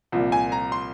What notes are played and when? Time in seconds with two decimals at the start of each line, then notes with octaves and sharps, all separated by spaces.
0.12 C2 A#2 F3
0.32 G#5
0.52 A#5
0.72 C6